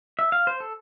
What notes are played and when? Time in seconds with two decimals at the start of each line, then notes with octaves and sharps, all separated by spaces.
0.19 E5
0.32 F5
0.47 C5
0.60 A4